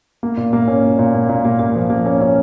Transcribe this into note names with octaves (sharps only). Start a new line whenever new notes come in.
A#3
A#2
A#3
C#4
A#2
A#2
A#3
A#2
A#3
A#3
F3
A#3
C#4
C#4